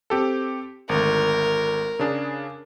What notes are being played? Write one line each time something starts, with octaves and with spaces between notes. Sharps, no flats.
C4 G4 A4
G#1 D2 A#4
C#3 D4 G#4